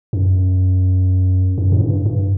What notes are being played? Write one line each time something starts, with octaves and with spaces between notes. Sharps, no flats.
F#2
F#2
A2
G2
G2